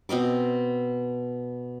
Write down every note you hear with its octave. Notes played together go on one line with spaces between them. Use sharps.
B2 C4 D#5 D6